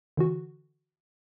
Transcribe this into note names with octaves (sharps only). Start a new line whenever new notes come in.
D3 E3 F#4